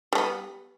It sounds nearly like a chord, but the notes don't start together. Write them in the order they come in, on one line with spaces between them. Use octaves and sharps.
G3 A3 B3